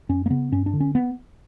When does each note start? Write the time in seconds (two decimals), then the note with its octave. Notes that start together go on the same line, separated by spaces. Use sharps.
0.09 F#2 C#4
0.26 A#3
0.30 C#3 B3
0.52 G2 C#4
0.66 D4
0.73 D3
0.80 C#4
0.95 B3